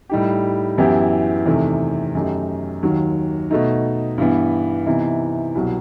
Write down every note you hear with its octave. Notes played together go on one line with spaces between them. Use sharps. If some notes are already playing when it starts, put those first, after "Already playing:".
A2 G3 D#4 G4
F#2 E3 B3 E4 G4
E2 C3 D#3 A3
F#2 D#3 A3 D#4 G4
D#2 D#3 F#3
B2 A3 D#4
G2 E3 B3
C3 E3 B3 D#4
C2 B2 F#3